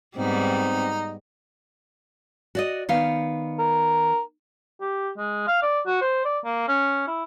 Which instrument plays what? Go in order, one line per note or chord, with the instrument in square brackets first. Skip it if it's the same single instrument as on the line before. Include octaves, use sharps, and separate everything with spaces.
[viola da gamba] G#2 G3 B3 [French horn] C4 [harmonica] D#4
[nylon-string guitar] F#4 D5 D#5
D#3 B3 F5
[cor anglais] A#4
G4
G#3
F5
D5
F#4
C5
D5
A#3
C#4
E4